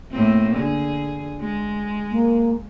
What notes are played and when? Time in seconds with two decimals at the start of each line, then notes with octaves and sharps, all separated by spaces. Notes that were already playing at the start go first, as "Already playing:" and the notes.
0.11 A2 A#3 C4
0.56 D3 G#4
1.41 G#3
2.12 A#3